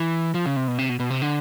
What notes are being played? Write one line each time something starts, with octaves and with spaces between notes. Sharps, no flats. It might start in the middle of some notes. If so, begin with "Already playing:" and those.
Already playing: E3
F3
C#3
C3
B2
C3
B2
B2
C3
D3